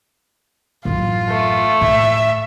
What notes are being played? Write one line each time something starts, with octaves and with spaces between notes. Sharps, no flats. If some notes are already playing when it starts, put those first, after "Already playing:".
A1 F#2 F4
A3
A2 E5